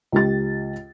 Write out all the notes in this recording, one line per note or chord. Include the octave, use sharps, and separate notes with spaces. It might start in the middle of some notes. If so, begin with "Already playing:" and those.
C#2 G4 A6